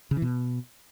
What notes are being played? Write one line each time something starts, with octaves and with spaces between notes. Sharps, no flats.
C#3
E3
B2